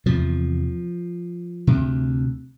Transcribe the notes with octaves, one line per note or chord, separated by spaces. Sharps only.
E2 C3 F3
D2 C3